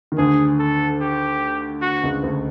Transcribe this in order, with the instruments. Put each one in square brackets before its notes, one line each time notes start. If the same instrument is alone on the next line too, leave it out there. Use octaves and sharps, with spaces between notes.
[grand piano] D#3
[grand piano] D2 D3 [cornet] G#4
[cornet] A4
G4
F#4
[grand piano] C#2 C#3
D2 D3